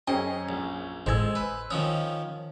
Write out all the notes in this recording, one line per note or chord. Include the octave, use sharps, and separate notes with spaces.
F#2 C#4 G#4 C5 D#5 G5
A#1
G#1 A2 G#3 C5 G#5 E6 G#6
B4
D#3 F3 C#4 D#6